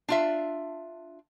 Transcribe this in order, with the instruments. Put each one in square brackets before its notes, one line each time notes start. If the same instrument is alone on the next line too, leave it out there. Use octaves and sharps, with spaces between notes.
[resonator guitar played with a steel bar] D4 F4 E5